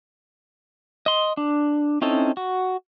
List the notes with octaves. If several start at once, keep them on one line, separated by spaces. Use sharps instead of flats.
D#5 C6
D4
C4 C#4 D#4 E4 A4
F#4